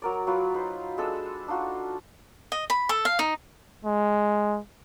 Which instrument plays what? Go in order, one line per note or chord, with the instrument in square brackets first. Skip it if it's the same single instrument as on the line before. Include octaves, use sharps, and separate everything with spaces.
[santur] F#3 A#4 D5
F#3 F4 B4
D#4 B4 C5
G#3 D4 A4 E6
D4 D#4 F4 F#4
[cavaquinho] D#5
B5
A4
F5
D#4
[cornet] G#3